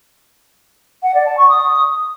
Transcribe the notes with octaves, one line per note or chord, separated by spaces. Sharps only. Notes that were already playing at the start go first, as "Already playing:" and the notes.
F#5
D5
A5
C#6
D#6